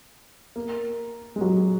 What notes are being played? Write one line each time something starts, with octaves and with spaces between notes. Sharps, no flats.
A#3
G#3
F#3